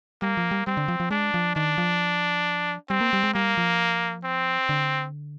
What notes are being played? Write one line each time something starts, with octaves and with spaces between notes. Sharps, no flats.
G3 A#3
F3
G3
G3 C4
D3
F3
F3
G#3 D4
F3
D#3 D4
F3
G3 C4
A#3
G3
G#3
G3 A#3
F3
C4
D3